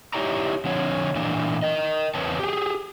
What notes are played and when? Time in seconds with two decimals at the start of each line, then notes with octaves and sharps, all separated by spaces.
0.13 D#4 E4 G4 C#5 D5 A#5
0.65 D3 F3 C4 C#5
1.15 A#2 E3 A#3 D4
1.62 A#4 D#5
2.15 E2 C4 B4 C#5 A5
2.39 G4 G#4